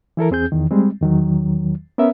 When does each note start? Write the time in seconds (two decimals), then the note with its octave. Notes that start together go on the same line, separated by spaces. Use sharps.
0.17 E3 E4 A4 A#4
0.31 E2 C4 G#4 G6
0.52 E2 D#3
0.71 G3 G#3 C4
1.01 E2 D#3 F#3
1.98 B3 C#4 A#4 E5